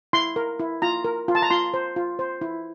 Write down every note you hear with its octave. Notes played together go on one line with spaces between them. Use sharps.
E4 C6
A#4
E4
F4 A#5
A#4
F4
A5
A#5
F4 C6
C5
F4
C5
E4